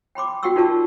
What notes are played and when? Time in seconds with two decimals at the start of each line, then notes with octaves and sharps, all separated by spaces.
0.15 G5 B5 C6 D6
0.43 F#4 F#5 G5 C6 C#6 E6
0.56 D#4 F4 A#4 D5 A5 C#6